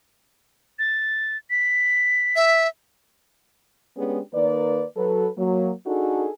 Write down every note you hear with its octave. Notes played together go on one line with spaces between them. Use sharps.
A6
B6
E5
G#3 B3 C#4 D4 G4 G#4
D#3 A#3 B4 D5
F#3 A4 B4
F#3 A#3
D4 D#4 F#4 G#4 A4